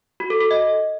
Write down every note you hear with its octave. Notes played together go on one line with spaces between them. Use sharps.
F#4
A4
A4
D#5